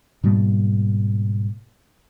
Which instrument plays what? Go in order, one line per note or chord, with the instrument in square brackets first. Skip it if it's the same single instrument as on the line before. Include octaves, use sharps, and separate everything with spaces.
[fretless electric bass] G#2 B2 G3 A#3